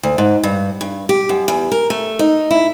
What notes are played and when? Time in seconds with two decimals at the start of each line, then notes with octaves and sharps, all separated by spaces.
0.03 D2
0.18 G#2
0.44 G2
0.81 G2
1.09 G4
1.29 F#2
1.48 E2
1.72 A#4
1.90 A3
2.19 D#4
2.51 E4